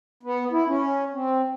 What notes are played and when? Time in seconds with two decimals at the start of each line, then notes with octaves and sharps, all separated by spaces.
0.23 B3
0.52 E4
0.68 C#4
1.13 C4